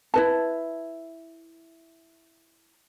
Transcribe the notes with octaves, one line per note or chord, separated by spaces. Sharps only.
E4 B4 A5